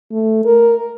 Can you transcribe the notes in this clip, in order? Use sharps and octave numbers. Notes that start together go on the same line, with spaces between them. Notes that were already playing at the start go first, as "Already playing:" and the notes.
A3
A#4